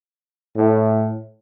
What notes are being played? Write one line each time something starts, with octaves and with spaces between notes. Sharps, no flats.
A2